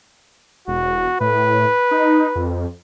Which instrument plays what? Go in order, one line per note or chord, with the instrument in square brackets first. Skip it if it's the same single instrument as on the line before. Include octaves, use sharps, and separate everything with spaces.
[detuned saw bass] E1 [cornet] F#4
[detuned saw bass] A2 [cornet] B4
[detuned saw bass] D#4
F2